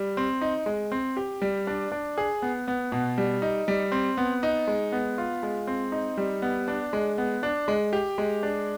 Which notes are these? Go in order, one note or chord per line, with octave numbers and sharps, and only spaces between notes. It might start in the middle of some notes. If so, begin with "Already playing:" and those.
Already playing: G3
C4
D#4
G#3
C4
G4
G3
D4
D4
G#4
B3
B3
B2
G3
D#4
G3
C4
B3
D#4
G#3
B3
F4
G#3
C4
D#4
G3
B3
D4
G#3
B3
D4
G#3
G4
G#3
D4